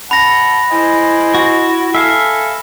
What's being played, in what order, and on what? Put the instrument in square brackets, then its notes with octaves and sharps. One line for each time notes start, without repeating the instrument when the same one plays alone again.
[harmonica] F#5 A5 [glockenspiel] B5 A#6
[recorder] E4 [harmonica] C5 D#5 G#5
[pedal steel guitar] F#4
[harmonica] A4 G#5 [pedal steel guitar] E5 F5